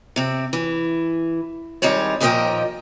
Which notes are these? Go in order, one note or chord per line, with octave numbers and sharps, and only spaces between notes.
C3 C4
E3
D#3 G3 G#3 C4 C#5
D#2 A#2 F3 A#4 D#5 G5